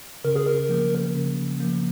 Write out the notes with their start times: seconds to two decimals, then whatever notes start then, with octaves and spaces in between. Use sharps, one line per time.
0.24 C#3 A#4
0.36 G#4
0.47 A#4
0.69 F3 A#3
1.14 C#3
1.60 F3 A#3